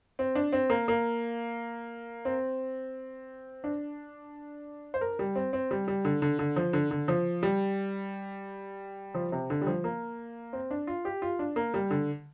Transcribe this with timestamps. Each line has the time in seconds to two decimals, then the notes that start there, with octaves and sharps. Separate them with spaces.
0.19 C4
0.35 D4
0.52 C4
0.70 A#3
0.88 A#3
2.25 C4
3.64 D4
4.94 C5
5.01 A#4
5.19 G3
5.36 C4
5.53 C4
5.71 G3
5.88 G3
6.05 D3
6.22 D3
6.39 D3
6.56 F3
6.73 D3
6.91 D3
7.08 F3
7.43 G3
9.15 F3
9.32 C3
9.50 D3
9.61 G3
9.67 F3
9.84 A#3
10.53 C4
10.71 D4
10.87 F4
11.05 G4
11.22 F4
11.39 D4
11.56 A#3
11.74 G3
11.91 D3